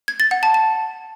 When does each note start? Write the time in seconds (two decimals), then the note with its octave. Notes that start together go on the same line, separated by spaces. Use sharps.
0.08 G#6
0.20 A6
0.31 F#5
0.43 A5
0.54 A5